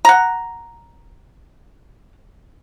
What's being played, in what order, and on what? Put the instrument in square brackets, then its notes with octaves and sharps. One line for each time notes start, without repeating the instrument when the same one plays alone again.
[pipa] F#5 A#5